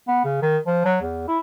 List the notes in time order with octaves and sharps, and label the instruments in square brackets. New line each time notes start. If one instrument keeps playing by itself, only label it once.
[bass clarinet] B3
C#3
D#3
F3
F#3
E2
E4